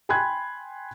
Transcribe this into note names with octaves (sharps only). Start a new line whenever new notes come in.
G5 G#5 B5 C6 F#6 G#6